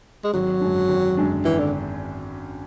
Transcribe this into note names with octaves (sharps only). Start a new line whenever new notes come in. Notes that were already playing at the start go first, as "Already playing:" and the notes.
G#3
G#1 F#3
F#2 D3 G#3 D4
G#1
F#2 D3 G#3 D4
G#1 E3
D3